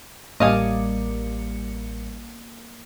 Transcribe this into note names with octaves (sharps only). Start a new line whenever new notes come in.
A1 G3 A#3 D5 D#5 F5 G#5 C#7